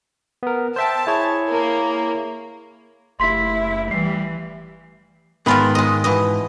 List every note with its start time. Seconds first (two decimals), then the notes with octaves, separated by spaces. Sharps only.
0.43 B3 A#4
0.76 C5 E5 G5 A5
1.07 E4 G#4 C#5
1.48 A#3
3.20 F#1 A3 E4 G4 F5 C6 B6
3.91 E3 G3 C7
5.46 G#2 D#3 B3 F4 A#4 B5
5.75 G#3 D#5
6.04 B2 E3 D#5